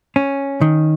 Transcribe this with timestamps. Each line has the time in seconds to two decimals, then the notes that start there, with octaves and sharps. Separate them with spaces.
0.16 C#4
0.61 D#3